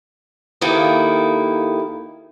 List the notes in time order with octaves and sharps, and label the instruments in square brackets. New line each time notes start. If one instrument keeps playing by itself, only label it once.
[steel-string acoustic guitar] D#2 D#3 A#3 E4 A4